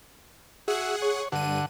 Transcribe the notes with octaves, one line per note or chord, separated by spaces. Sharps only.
F#4 G#4 E5 F#5
C#5
G2 D3 F#5 D#7